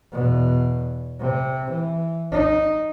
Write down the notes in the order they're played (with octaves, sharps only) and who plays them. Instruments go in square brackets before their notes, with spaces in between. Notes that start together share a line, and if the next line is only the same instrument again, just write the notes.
[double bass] E2 B2
C3
E3
D#4